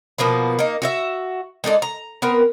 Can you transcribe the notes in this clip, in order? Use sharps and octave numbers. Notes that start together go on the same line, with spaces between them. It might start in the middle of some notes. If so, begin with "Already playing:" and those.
B2 F3 A#3 B3
A#3 D#4
F#4 G4 E5
G#3 D#4 A4 D5
A#5
B3 C4 A#4